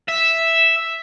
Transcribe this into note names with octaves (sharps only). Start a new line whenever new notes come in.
E5